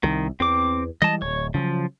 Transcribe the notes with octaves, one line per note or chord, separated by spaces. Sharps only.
C2 D#3
E2 C4 D6
E3 G3 G#3 D#5 A5
D1 C#5
C#3 F3 F#3